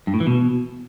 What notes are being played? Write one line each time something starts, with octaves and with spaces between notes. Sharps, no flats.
G2
A2
E3
B2